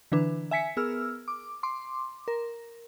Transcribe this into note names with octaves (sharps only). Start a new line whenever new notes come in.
D3 E3 D4 B4
E5 G#5 B6 C#7
B3 G#4 A#4 E6 F6
D6
C6 D6
A#4